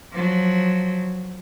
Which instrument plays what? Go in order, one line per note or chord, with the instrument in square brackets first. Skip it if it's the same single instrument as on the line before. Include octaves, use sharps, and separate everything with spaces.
[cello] F3 F#3